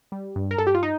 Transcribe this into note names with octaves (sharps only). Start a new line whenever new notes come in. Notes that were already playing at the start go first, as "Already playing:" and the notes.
G3
G2
A#4
G2 A4
G4
F4
D#4